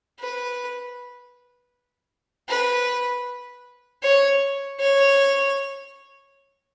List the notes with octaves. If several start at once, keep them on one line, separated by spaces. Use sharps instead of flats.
B4
B4
C#5
C#5